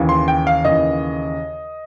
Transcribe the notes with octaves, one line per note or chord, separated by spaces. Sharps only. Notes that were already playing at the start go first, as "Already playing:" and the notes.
Already playing: D#2 C#3 E3
C6
G5
F5
D#2 C#3 E3 D#5